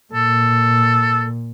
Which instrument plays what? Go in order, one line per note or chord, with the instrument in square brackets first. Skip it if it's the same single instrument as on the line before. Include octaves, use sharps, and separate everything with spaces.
[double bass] A#2 [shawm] A4